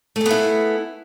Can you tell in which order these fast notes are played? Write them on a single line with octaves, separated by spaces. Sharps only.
A3 G#4 B3 E4